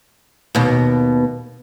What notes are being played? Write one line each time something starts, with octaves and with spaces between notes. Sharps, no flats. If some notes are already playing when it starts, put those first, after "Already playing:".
D#2 B2